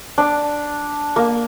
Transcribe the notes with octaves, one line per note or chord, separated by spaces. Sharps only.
D4
A#3